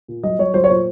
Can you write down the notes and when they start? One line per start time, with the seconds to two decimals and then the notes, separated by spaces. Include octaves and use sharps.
0.08 A#2
0.23 F#3 D#5
0.39 F#3 C#5
0.54 F#3 C5
0.64 C#5
0.70 A#2 C5